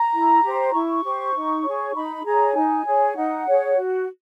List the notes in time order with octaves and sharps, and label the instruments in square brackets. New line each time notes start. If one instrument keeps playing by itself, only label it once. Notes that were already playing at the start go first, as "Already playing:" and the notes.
Already playing: [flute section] A#5
E4
G4 C5
E4 C#6
G4 C5
D#4
G#4 C#5
D#4 B5
G#4 C#5 A#5
D#4 G#5
G#4 C#5
D#4 F#5
G#4 C#5
F#4